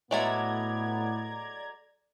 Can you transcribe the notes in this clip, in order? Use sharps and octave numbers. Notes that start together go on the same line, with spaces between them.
A2 F#3 G#3 A3 B3 D5 A#5 G#6